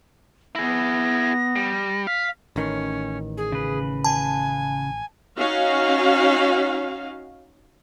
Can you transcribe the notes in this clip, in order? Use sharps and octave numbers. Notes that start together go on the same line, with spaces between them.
B3 E4 G#4 A#6
G3
F5 B6
A1 D#3 C#4
G#4
C#3 B4
G#5 A5
C#4 D#4 F#4 F5